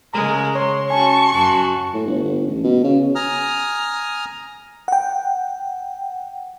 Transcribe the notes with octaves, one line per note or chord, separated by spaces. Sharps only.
C#3 G#3 A#4 A#5
C#5 C6
C#4 F#4 G#5 A5 C#6
F#2 F#4 A5
A2
G1
G1
A1
B2
C#3
G#5 A#5 D#6 F6
F#5 G5